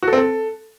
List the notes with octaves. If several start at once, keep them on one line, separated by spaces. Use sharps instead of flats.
F#4
A4
C4
A4